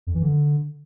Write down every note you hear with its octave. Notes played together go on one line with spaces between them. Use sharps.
F2
E3
D3